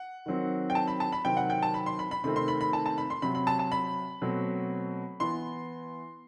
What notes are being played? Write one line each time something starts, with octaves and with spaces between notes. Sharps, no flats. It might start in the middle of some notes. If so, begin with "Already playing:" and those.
Already playing: F#5
D#3 F#3 C4
G5
A5
B5
A5
B5
C3 D#3 F#3 C4 G5
F#5
G5
A5
B5
C6
B5
B5
C3 D#3 A3 C4 B5
C6
B5
B5
A5
A5
B5
C6
C3 F#3 C4 B5
B5
A5
A5
B5
B2 F#3 A3 C4
E3 B3 C6